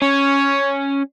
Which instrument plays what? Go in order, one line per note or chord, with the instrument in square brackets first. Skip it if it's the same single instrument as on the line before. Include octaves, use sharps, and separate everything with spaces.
[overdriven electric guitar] C#4 [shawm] C#5